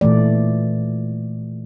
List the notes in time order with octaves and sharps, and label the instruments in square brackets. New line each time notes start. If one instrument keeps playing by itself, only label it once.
[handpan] A#2 E3 A3 D5